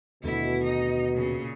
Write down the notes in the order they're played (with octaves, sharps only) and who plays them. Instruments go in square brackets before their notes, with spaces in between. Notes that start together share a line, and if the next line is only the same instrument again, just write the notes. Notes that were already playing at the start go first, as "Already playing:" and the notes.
[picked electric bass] D#2 D3 A3 [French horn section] B2 [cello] E4
[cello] D#4
A#2 C#3